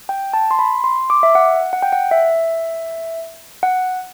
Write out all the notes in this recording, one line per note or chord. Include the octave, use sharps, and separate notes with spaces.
G5
A5
C6
B5
C6
D6
E5
F#5
F#5
G5
F#5
E5
F#5